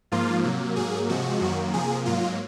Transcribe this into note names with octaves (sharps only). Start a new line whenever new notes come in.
G#2 F3 A#3 F4
C3 F#3 A#3
G#2 F#3 A#3 G#4
C3 F3 G#3 F#4
F#2 D#3 F#3 A#3
C3 F3 A#3 G#4
G#2 F#3 A#3 F4